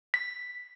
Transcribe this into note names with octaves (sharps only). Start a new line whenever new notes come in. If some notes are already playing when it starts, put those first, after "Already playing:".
B6